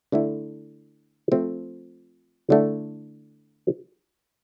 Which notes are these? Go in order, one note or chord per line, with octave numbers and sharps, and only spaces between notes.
D3 A3 E4
F3 A3 C4
D3 A3 E4